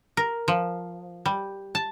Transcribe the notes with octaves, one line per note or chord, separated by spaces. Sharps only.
A#4
F3
G3
A5